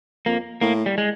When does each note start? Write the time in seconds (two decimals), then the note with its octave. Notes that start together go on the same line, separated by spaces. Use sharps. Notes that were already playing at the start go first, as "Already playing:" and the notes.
0.26 F2 A#3
0.61 A2 A#3
0.86 G3
0.98 G#3